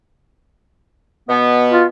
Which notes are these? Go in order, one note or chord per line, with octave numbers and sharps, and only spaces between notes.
B2 B3
F4